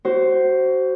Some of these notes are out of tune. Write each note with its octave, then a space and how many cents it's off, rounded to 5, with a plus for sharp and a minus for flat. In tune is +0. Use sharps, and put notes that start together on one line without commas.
F#4 +25 C5 +0